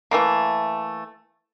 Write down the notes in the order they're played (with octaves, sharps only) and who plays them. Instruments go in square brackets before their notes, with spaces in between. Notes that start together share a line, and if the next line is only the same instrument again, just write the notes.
[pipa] E3 A3 A#3